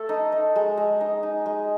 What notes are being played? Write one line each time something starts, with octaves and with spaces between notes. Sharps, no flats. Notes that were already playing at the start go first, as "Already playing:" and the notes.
Already playing: A3 A4
D#4
D#4
G#3
G#3
D#4
D#4
G#3